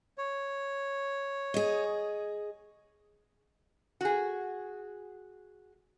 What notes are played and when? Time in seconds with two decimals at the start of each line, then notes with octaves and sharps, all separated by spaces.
0.18 C#5
1.54 G#4 D#5
4.01 F#4 G#4